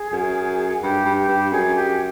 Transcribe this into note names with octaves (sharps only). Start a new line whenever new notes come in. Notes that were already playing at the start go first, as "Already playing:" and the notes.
Already playing: G#4
F#2
G2 G4
G2
G4
G2
F#2 G#4
G4